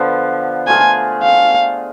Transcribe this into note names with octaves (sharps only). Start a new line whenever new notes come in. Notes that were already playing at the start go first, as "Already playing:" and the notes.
Already playing: D3 F3 B3
A3 F4 G#4 G#5
F5